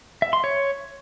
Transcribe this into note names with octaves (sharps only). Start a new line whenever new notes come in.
E5
C6
C#5